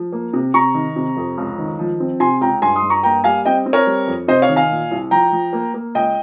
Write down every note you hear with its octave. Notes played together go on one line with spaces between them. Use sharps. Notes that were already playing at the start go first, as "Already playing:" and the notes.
Already playing: F3
A#3
C3
C3 A#5 C#6
D#3
C3
F2
C#2
D#3
F3
C4
C3 G#5 C6
C#2 G5 A#5
G2 G#5 C6
C6 D#6
G2
A#5 C#6
A#3 G5 A#5
G3 F5 G#5
C4 D#5 G5
C4
A#4 C#5
G3
F2
C3 C5 D#5
C#5 F5
D#3
F5 G#5
A#2
C2
F3 G5 A#5
F3
A#3
A#3
C#2 D#5 G5